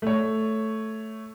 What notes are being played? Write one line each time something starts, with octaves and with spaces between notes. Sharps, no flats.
A3 C#5